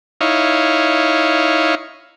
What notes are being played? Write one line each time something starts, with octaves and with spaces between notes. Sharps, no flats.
D#4 E4 C#5 F5